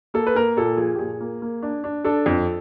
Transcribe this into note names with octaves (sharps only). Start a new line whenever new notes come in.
A#3 A4
B4
A#3 A#4
A#2 A4
F3 G#4
G4
A#2 G#4
A#3
A#3
D4
D4
D4 A4
F2